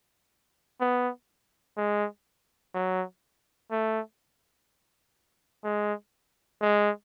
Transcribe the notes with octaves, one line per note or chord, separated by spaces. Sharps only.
B3
G#3
F#3
A3
G#3
G#3